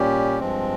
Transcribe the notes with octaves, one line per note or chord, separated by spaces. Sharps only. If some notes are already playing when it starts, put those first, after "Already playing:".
Already playing: A#2 G3 C#4 G4
G2 F3 G#3 C4